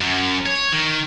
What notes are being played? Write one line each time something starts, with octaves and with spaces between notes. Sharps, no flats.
F#2
C#5
D#3